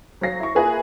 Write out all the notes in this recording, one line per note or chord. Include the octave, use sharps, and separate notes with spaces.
F#3 C5 F5 A#6 C7
E4 C#6
A#3 F4 G#4 A#4 B4 E5